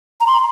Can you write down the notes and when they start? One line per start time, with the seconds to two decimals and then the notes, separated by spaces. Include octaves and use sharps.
0.21 A#5
0.27 C6